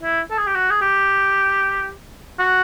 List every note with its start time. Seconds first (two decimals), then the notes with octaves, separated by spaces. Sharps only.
0.02 E4
0.31 A4
0.38 G#4
0.47 G4
0.55 F#4
0.71 G#4
0.81 G4
2.39 F#4